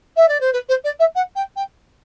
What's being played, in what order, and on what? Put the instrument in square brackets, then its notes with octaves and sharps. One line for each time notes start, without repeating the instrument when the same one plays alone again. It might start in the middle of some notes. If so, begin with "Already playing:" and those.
[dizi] E5
D5
C5
B4
C5
D5
E5
F#5
G5
G5